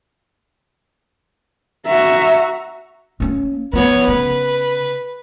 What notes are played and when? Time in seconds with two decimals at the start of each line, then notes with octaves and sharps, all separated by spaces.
1.87 F#4 E5 A#5
3.20 A#3 C#4
3.73 D#3 F3 B3 C#5
4.08 C#3 B4